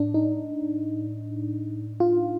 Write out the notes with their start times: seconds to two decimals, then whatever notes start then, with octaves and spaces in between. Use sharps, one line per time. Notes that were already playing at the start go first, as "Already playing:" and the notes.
Already playing: A2 D4
0.14 D#4
2.00 F4